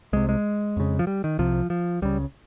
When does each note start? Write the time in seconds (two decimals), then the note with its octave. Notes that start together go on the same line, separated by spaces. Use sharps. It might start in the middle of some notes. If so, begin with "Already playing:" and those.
0.13 C2 C3 G#3
0.29 G#3
0.77 F2 C#3
0.99 F3
1.07 G3
1.24 D#3
1.39 C2 C3 F3
1.70 F3
2.02 C#2 C#3 G3